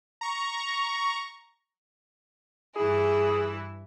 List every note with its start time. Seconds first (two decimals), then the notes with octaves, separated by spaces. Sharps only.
0.21 A#5 C#6
2.76 G2 E3 E4 G#4